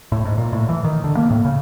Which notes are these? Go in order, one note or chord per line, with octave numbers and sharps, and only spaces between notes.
A2
G#2
A#2
A2
E3
D#3
D3
A#3
A2
C#3